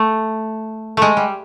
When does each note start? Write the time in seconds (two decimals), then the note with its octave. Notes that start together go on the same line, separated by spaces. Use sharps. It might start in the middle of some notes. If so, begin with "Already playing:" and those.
Already playing: A3
0.97 G#3 A3
1.17 G3